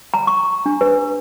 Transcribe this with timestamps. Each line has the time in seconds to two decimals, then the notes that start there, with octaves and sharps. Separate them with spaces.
0.14 A#5
0.27 C#6
0.66 D4
0.81 B4